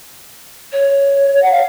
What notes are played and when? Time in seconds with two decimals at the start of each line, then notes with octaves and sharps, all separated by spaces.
0.72 C#5
1.42 F#5
1.51 F5